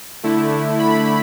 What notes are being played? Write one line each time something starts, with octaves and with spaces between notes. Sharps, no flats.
D3 A3 E4
B5